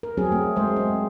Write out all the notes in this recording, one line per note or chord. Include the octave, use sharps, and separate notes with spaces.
A#4
F#3 C4 G#4
A3
G#3 C5
C4